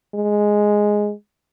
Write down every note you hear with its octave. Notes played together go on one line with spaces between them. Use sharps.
G#3